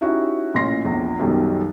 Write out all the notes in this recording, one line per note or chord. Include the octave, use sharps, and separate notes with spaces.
C#4 D#4 E4 F#4 G4
A1 A#2 C#4 C6 A#6 C7
A#1 E2
B1 F#2 B2 D#3 G3